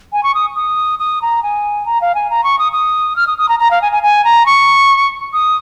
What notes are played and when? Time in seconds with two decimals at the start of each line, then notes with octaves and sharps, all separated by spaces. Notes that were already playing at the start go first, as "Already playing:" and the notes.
0.13 G#5
0.23 C#6
0.35 D#6
0.56 D#6
0.99 D#6
1.22 A#5
1.43 G#5
1.86 A#5
2.01 F5
2.15 G#5
2.30 A#5
2.44 C#6
2.59 D#6
2.72 D#6
3.16 F6
3.27 D#6
3.38 D#6
3.49 A#5
3.60 A#5
3.71 F5
3.82 G#5
3.92 G#5
4.03 G#5
4.25 A#5
4.46 C#6
5.33 D#6